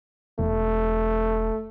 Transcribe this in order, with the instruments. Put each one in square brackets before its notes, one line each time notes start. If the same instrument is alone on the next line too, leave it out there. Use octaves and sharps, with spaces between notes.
[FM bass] E1 [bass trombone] A3